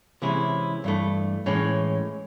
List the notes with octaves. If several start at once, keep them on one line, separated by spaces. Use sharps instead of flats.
C3 E3 G#3 C#4 E4
G2 E3 A3
A2 E3 G#3 C#4